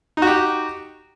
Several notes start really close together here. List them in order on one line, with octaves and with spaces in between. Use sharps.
D#4 F#4 G4